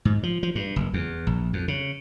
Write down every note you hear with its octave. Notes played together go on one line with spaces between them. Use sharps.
G#2
F3
F3
G2
F#1
E2
A#1
F2
C#3